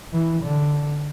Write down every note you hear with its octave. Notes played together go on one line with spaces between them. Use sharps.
E3
D3